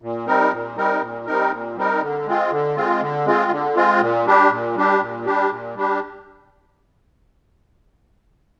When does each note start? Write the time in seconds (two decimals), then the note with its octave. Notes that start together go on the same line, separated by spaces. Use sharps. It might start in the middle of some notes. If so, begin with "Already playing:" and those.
0.02 A#2
0.27 G3 C4 D#4 A#4
0.52 A#2
0.77 G3 C4 D#4 A#4
1.02 A#2
1.26 G3 C4 D#4 A#4
1.51 A#2
1.76 G3 C4 D#4 A#4
2.02 D3
2.26 G#3 C4 F4
2.51 D3
2.76 G#3 C4 F4
3.01 D3
3.26 G#3 C4 F4
3.51 D3
3.76 G#3 C4 F4
4.01 A#2
4.26 G3 D4 G4
4.51 A#2
4.76 G3 D4 G4
5.01 A#2
5.25 G3 D4 G4
5.50 A#2
5.75 G3 D4 G4